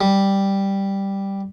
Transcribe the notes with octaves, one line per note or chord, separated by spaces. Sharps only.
G3